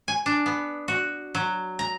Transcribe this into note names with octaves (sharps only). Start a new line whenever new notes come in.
G#5
D4
B3
F#4
F#3
A#5